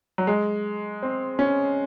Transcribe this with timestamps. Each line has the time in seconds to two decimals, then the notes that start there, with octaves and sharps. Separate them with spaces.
0.18 F#3
0.27 G#3
1.02 C4
1.39 C#4